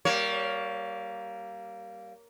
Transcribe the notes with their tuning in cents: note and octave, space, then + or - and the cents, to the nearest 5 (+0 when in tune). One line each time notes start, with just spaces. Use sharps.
G3 -20 A#3 +0 C#5 +10